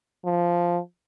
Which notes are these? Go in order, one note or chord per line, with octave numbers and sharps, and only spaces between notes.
F3